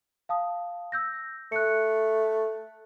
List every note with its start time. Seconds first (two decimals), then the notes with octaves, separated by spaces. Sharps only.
0.29 F5 A5 D#6
0.92 E6 G6 A#6
1.52 A3 F#6 C#7